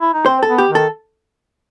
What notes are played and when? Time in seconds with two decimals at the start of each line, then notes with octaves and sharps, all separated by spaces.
0.01 E4
0.14 D#4
0.26 C4 C5
0.43 A4
0.48 B3
0.58 G4
0.69 D#3
0.75 A4